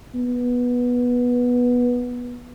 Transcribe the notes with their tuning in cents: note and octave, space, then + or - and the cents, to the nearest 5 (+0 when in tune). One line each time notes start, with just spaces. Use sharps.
B3 -10